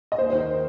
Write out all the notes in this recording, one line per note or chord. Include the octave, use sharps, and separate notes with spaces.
D#5
D#2 C5
C5
D#3
A#4